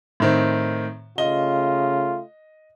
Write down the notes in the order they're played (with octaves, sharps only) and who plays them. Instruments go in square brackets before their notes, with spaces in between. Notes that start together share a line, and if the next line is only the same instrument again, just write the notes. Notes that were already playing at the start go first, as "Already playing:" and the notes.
[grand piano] A2 D#3 C4
[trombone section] C#3 A3 F4 [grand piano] D#5 G7